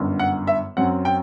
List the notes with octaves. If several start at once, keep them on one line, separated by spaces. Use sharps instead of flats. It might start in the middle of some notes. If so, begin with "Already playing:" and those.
Already playing: G1 F#2 D3
F#5
E5
F#2 F#3 C4 F#5
G5